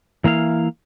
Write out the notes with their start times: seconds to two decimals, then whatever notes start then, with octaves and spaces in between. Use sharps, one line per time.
0.24 E3 A#3 E4 F5